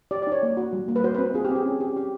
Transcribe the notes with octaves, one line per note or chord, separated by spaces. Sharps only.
G4 D5
D5
D#4 C#5
A#3
F#4
G3
A#3
B4
F#4 C5
B4
C4
F4 G#4
G4
C4
G#4
C#4
G4
G4